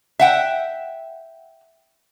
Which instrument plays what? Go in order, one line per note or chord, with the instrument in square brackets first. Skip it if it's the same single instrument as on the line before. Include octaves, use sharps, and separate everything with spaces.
[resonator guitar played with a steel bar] E5 F#5 G5